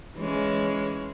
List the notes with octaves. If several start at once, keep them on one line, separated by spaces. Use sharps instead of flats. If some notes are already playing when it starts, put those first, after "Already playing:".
E3 G#3 C#4